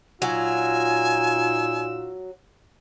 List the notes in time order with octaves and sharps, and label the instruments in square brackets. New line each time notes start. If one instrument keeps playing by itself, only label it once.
[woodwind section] A#2 D#4 E6 [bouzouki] F#3 [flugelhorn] F4 [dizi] G#5